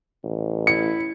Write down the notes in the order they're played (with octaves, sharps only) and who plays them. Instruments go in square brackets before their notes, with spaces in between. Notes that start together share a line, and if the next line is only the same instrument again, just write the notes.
[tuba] A1
[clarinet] E4 [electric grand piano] C#7